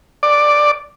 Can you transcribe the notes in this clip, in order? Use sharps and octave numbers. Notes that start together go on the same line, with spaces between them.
D5